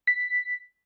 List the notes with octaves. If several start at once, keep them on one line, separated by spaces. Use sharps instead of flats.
B6